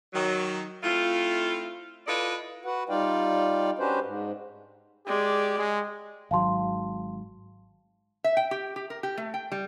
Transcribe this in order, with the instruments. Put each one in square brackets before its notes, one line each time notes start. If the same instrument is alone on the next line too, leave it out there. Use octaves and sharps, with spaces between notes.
[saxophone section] D#3 F#3
A3 C4 E4 F4
E4 F4 A4 B4 D5 D#5
[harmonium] F#4 B4 F#5
G3 D#4 F4 D5 F5 G5
C#4 D4 F#4 G4 B4 C5
G#2
[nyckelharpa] G#3 D5 [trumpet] G4
[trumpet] G#3
[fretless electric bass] G#1 G#2 F#3 [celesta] F5 A5 C6
[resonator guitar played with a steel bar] E5
G5
G4
G4
A#4
G4
A3
G5
G3